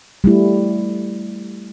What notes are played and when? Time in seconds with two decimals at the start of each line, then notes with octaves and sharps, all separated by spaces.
0.24 G3 A3 E4